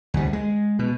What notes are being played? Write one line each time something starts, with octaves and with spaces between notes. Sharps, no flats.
D2 G3
G#3
B2